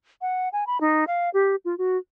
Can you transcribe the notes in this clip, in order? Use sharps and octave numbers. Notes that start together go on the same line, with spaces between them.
F#5
G#5
B5
D#4
F5
G4
F4
F#4